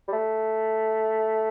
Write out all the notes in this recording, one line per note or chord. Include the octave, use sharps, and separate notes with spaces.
G3
A3